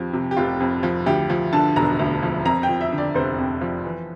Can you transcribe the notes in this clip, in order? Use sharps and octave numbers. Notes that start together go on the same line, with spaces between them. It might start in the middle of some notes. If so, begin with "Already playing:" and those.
Already playing: F2 F3 G4
C3
G4
F1 F4
F2
F3
D2 G4
F3
D3 A5
E1 A#5
D2
F3
F2 A#5
G5
F3
E5
D3
D5
F1 C5
F2
F3
E3